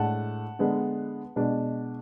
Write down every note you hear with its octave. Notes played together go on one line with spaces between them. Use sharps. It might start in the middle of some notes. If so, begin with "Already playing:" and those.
Already playing: A2 G#3 D4 F#5 A5
D3 G#3 B3 D4
B2 G#3 D4